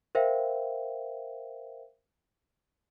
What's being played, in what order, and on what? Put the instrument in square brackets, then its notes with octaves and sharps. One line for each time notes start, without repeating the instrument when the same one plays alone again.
[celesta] A#4 C5 E5 F5 G5